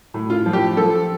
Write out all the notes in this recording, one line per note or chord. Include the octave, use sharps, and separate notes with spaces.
A2
F4
F3
G4
F3 A4